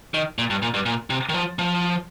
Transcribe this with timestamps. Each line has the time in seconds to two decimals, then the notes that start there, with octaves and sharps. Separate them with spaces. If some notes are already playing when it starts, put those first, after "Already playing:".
0.14 D#3
0.38 A#2
0.50 G2
0.62 A#2
0.74 G2
0.86 A#2
1.10 C3
1.29 D#3
1.34 F3
1.59 F3